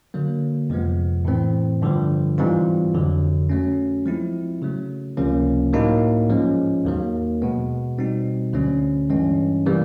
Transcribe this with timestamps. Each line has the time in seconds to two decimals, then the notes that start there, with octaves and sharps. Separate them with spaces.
0.14 D3 F#3 A#3
0.70 F2 C3 F3 G#3 B3
1.25 A2 E3 A3 C4
1.82 G2 D3 F3
2.38 G#2 E3 G3 C4 F4
2.94 F2 D3 F#3
3.49 F#3 A3 C#4
4.06 F3 G#3 C4 E4
4.62 C#3 F#3 A3
5.17 C#2 C3 F3 A#3 C#4
5.73 A2 F#3 A#3 D#4
6.29 G#2 F3 G#3 C#4
6.85 D#2 D#3 F#3 A#3
7.42 B2 G#3 B3
7.98 B2 G3 C4 D#4
8.53 D2 D3 F#3 A3 C#4
9.10 G2 E3 G#3 C#4
9.66 C3 E3 G3 A#3